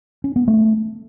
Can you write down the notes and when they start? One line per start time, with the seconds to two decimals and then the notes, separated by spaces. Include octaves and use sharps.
0.24 C#4
0.36 B3
0.48 A3